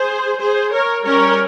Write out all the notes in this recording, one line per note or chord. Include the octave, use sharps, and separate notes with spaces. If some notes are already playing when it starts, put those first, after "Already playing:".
Already playing: G#4 C5
G#4 C5
A#4 C#5
G3 C#4 A#4 C#5